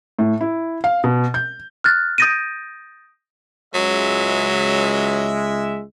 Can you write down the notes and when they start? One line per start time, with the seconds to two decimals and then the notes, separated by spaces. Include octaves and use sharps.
0.19 A2
0.41 E4
0.84 F5
1.04 B2
1.34 G6
1.84 F6 F#6 A6
2.18 D#6 G6 A6 A#6 D7 D#7
3.75 C#2 F#3 G#3 E5